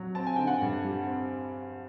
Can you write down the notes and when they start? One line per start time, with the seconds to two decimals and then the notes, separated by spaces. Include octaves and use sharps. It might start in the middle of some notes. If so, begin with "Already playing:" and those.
Already playing: F#3
0.15 C4 A5
0.27 G#5
0.36 D3 G5
0.47 F#5 G#5
0.61 G2
0.84 G3
1.07 C4